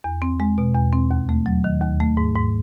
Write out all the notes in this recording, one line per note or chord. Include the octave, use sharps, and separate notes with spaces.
E2
C4
G#3
B2
E2
C4
D#2
A3
F#3
D#3
D#2
A3
G#2
G#2